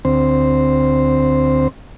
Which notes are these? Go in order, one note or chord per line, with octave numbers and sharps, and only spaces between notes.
D2 C4 C5